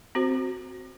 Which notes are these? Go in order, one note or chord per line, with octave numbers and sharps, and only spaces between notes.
C4 F#4 C5